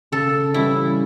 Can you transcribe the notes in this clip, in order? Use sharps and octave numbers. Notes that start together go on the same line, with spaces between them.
C#3 A4
E3 G3 C#4 E4